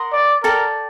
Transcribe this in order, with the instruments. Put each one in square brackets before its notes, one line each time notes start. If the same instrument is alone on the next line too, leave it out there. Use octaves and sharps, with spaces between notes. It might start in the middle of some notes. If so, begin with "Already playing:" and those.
Already playing: [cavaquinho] A#4 F#5 C6 D#6
[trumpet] D5
[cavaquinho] A4 D5 G5 [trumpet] A#4